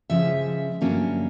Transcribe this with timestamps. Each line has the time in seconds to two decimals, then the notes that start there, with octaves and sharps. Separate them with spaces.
0.10 C#3 F3 G#3 C#4 E5
0.81 G2 D3 F#3 A#3 C#4